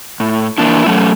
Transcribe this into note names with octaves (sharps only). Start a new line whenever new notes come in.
A2
E3 A#3 D4 E4
F#3 A3 C#4